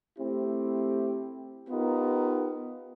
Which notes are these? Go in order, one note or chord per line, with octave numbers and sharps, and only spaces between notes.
A3 C4 E4 G4
B3 D#4 F4 G4 A#4 B4